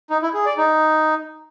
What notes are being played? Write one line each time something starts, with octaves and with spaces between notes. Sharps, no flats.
D#4
E4
G#4
D5
D#4